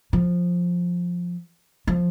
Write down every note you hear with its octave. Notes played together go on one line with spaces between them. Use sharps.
F3
F3